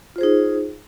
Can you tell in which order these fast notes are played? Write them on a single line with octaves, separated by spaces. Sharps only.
F4 C5 G#4 D#4